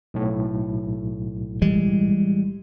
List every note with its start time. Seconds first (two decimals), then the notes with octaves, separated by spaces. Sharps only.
0.14 B1 A2
1.62 E3 G3 G#3